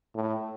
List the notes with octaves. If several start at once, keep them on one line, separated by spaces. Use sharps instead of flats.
A2